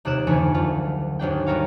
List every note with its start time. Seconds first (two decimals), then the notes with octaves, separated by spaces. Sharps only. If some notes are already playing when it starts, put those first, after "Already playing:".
0.05 D#1 D#2 C3 D6 F#6 E7
0.27 F1 D2 E3 B3 E4 G#5
0.54 F#1 F4
1.19 G#1 D#2 D4 G5
1.47 G3 B3 F#4 A#4 C#5 F5